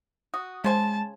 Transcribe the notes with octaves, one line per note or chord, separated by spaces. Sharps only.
F#4 D#6
C#3 G#3 C5 G#5 A5